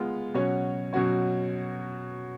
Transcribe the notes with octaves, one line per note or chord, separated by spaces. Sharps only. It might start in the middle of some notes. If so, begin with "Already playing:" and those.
Already playing: G#3 B3 F4
B2 F#3 C#4 F#4 C#5
B2 F#3 C#4 F#4 C#5